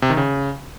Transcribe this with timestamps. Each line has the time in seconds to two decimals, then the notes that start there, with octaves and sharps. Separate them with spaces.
0.02 C3
0.10 D#3
0.17 C#3